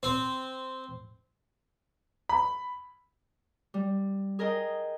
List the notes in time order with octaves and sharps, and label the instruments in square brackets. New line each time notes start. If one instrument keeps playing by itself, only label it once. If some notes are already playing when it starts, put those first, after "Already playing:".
[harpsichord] C4
[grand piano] B5
[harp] G3
G#4 A#4 D#5 G5